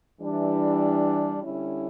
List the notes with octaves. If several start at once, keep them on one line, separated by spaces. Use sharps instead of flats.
E3 G3 D4
D3 G3 C#4 E4